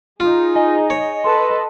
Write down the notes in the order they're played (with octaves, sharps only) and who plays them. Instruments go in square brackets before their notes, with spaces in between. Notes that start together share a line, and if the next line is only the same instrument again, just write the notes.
[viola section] D#4 G#4 [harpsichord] F4
[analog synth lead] D#5 [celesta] G#5
[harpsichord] C#5
[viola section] A4 B4 [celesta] C6